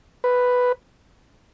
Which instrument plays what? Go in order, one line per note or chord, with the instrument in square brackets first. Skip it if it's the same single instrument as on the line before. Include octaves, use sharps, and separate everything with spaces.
[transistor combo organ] B4